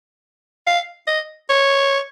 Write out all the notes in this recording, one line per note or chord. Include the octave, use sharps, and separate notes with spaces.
F5
D#5
C#5